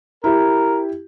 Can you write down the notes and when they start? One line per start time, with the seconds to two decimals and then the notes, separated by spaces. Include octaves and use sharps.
0.24 E4 G4 A#4